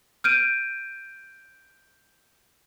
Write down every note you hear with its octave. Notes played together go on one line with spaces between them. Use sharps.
F6 G6 D7 D#7